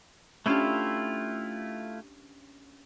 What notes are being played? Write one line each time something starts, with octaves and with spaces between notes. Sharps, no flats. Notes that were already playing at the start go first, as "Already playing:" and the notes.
A3 C#4 D4 E4 F4 G4